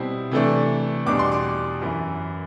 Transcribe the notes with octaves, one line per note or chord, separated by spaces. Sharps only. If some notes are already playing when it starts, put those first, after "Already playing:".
Already playing: B2 G3 C4 E4
C3 E3 A3 D4
E2 B2 G3 D4 D6
C6
D6
F#2 E3 B3 E4